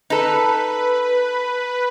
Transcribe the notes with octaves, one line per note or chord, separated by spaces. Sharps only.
D#4 A4 B4